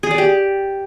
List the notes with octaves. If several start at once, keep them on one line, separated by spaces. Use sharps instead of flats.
G#4
D5
G4